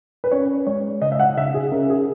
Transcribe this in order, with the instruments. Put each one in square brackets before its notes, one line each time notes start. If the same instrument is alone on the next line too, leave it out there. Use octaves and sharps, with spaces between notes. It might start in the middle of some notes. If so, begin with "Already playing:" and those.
[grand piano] B4
[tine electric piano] C#4 [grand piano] C#5
[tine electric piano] G#3 [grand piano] C#5
[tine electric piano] C#3 [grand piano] D#5
[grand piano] E5
F#5
[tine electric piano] C#3 [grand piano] E5
[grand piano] G#4
[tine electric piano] C#4 [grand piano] A#4
[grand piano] G#4